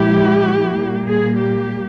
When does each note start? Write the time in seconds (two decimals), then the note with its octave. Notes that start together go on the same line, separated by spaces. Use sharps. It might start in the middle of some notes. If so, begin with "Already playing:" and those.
Already playing: A#2 F3 G#3 E4 G4
0.75 A#2 G3 A#3
1.06 G#4
1.37 G4